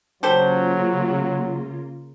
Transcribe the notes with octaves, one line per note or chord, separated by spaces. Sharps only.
C#3 F#3 A#3 F4 G4 A4 C5